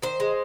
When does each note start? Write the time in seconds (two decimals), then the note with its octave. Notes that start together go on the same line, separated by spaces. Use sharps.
0.02 D#3 C5
0.20 G#3